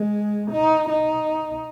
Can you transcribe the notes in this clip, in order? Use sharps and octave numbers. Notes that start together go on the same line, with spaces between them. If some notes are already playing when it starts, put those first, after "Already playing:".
Already playing: G#3
D#4
D#4